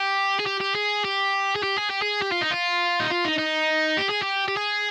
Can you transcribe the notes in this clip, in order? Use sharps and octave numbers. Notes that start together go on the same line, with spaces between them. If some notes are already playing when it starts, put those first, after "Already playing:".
Already playing: G4
G#4
G4
G4
G#4
G4
G#4
G4
G#4
G4
G#4
G4
F4
D#4
F4
D#4
F4
D#4
D#4
G4
G#4
G4
G4
G#4